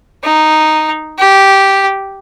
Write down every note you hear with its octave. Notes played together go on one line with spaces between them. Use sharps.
D#4
G4